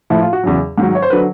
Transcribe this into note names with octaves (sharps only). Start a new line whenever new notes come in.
A2 F3 E4
F4
F#4
E2 C#3 F#3
G#2 D#3 F#3
C#5
C5
D3 F#3 B4